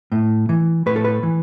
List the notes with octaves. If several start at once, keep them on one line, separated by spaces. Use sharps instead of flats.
A2
E3
A2 B4
A4
B4
E3